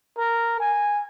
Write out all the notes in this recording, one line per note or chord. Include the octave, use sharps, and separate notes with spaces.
A#4
G#5